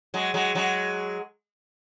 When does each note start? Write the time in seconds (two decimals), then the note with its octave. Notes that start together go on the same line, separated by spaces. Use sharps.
0.14 F#3 G#3
0.34 F#3 G#3
0.55 F#3 G#3